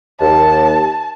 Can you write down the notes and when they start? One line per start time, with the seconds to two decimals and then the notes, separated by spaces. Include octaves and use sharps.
0.21 D#2 A5